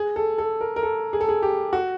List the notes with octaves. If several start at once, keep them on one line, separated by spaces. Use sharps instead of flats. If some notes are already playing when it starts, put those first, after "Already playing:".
Already playing: G#4
A4
A4
A#4
A#4
A4
G#4
A4
G#4
G4
F#4